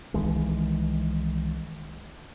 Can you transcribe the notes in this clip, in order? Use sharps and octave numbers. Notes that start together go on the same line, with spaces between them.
C2 D#3 E3 G#3